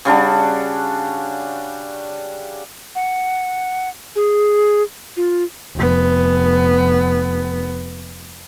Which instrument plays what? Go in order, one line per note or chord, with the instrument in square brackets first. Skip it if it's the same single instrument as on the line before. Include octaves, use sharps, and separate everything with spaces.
[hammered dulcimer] C#3 G3 D4 F#4
[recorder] F#5
G#4
F4
[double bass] F1 B3